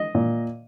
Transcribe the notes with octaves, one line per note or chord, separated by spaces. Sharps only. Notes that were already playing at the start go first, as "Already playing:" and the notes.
Already playing: D#5
A#2